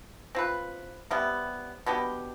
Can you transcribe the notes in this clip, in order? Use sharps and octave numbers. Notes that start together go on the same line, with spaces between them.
C4 F4 B4
C3 G3 B3
B2 B3 D4 G4